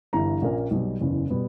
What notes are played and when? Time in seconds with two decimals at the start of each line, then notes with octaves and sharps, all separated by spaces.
0.13 G1 G2 E3 A#5
0.42 A#1 A#2 A#3 C#4
0.71 B1 B2 G3
1.01 F#1 E2 C#3
1.30 B2 G3 B3